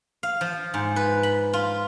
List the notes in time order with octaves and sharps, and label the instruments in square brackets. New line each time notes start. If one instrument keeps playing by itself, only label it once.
[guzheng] F5
F3
G#2
B4
B5
F4